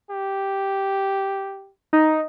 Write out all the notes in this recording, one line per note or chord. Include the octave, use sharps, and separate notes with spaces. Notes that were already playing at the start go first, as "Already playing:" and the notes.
G4
D#4